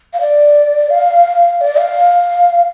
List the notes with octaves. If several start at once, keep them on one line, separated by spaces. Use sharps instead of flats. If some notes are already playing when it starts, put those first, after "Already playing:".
F5
D5
F5
D5
F5